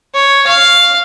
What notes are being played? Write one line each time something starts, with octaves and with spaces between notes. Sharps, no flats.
C#5
F5